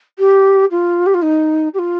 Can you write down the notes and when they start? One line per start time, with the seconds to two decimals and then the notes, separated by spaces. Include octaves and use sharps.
0.19 G4
0.71 F4
1.06 G4
1.14 F4
1.22 D#4
1.74 G4
1.78 F4